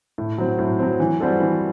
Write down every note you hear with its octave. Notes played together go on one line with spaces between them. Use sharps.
A2
F#3 C4
A2
F#3 C4
E3
G3 C4 F#4 A4
E3